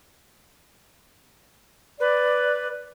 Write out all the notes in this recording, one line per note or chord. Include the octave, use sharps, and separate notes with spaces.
B4 D5